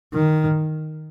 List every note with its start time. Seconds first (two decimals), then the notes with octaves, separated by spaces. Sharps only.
0.14 D#3